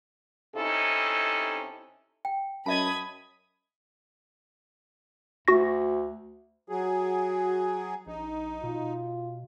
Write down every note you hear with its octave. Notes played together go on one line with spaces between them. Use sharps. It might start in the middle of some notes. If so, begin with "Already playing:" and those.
C3 C#4 D#4 E4 A4
G5
F#2 D#5 E5 A5 B5 D#6 G#6
D2 F#4 C#6 A#6
F#3 F#4 G#4
A#1 D#4
B2 F4